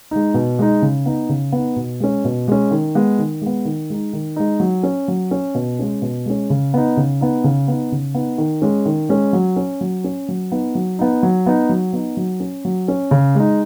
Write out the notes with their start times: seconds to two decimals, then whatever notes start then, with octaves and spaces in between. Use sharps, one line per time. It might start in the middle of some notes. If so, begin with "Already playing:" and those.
0.11 G#3 D#4
0.34 B2
0.59 G#3 D#4
0.82 C#3
1.06 B3 D#4
1.29 C#3
1.52 B3 D#4
1.76 B2
2.00 G#3 C#4
2.24 B2
2.48 G#3 C#4
2.71 D#3
2.95 G#3 B3
3.19 D#3
3.42 G#3 B3
3.65 D#3
3.90 G#3 D#4
4.13 D#3
4.36 G#3 D#4
4.60 F#3
4.83 C#4
5.08 F#3
5.31 C#4
5.55 B2
5.79 G#3 C#4
6.02 B2
6.26 G#3 C#4
6.50 C#3
6.74 B3 D#4
6.97 C#3
7.21 B3 D#4
7.44 C#3
7.68 B3 D#4
7.92 C#3
8.15 B3 D#4
8.38 D#3
8.62 G#3 C#4
8.86 D#3
9.09 G#3 C#4
9.33 F#3
9.56 C#4
9.81 F#3
10.04 C#4
10.28 F#3
10.52 B3 D#4
10.75 F#3
10.99 B3 D#4
11.23 F#3
11.46 B3 D#4
11.69 F#3
11.93 B3 D#4
12.17 F#3
12.40 C#4
12.65 F#3
12.88 C#4
13.11 C#3
13.35 G#3 D#4